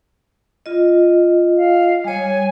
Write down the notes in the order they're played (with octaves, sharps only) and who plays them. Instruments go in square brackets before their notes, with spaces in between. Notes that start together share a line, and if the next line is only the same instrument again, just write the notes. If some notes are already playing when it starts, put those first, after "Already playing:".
[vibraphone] F4 D#5
[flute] F5
[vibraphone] G3 C#5 [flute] G#5